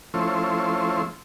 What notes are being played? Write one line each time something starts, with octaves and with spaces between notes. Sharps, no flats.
F3 A3 C#4 E4 C5